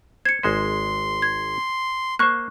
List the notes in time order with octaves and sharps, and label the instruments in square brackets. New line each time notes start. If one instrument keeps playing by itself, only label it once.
[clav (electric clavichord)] C5 [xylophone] G#6 C#7
[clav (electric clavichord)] G#1 G#3 C5 [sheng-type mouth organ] C6
[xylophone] G#6
[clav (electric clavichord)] A#3 C5 [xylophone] C#6 F#6